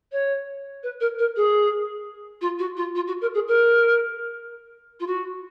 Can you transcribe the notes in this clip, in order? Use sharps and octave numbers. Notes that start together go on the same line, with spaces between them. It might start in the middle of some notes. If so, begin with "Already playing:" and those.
C#5
B4
A#4
A#4
G#4
F4
F#4
F4
F4
F#4
A#4
G#4
A#4
F4
F#4